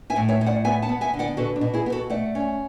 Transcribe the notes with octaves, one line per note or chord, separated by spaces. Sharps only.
E5 G#5
A2
C#5 E5
A2
D5 F#5
B3 E5 G#5
F#5 A5
B3
E5 G#5
D3
D5 F#5
B2 F#4 A4
D4
B2
E4 G#4
B3
F#4 A4
A3 D5 F#5
C#4